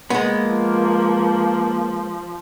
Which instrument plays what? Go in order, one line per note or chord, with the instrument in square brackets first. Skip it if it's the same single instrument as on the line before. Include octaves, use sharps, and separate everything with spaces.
[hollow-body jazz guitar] G#3 B3 [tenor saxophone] A#3
[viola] F3